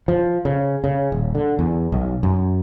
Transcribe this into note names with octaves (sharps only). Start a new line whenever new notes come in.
F3
C#3
C#3
D#1
D3
E2
B1
F#2